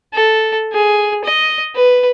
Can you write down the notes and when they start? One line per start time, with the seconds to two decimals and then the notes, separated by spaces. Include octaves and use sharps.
0.14 A4
0.73 G#4
1.25 D#5
1.75 B4